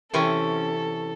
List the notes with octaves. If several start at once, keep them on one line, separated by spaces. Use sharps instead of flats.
C3 E3 C#4 A4